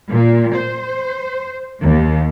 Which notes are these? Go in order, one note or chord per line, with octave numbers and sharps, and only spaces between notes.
A#2
C5
D#2